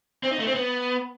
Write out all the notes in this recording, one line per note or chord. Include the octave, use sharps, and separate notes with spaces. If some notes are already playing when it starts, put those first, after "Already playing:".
C4
D#4
A3
C4
B3